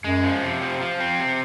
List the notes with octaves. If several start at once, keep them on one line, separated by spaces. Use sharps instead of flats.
F#2 G#3
F3
C3
F3
F3
C4
C3